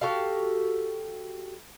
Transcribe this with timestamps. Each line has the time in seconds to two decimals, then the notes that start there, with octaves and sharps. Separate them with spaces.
0.01 F#4 G4 A4 F5